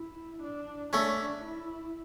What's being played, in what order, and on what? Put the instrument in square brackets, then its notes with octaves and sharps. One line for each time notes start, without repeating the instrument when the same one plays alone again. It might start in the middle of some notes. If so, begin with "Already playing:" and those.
Already playing: [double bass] E4
D4
[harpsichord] A3 C#4 [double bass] D4
[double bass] E4